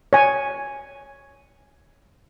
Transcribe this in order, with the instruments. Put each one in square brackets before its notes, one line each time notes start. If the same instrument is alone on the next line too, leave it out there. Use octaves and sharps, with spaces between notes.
[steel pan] C#5 G#5